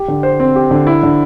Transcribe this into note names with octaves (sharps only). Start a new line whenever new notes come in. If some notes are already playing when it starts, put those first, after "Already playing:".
Already playing: G4
D3
C5
C4
G4
D3
E4
D3